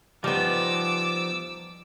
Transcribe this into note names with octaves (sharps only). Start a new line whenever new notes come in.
F3 G3 B3 D#4 D6 E6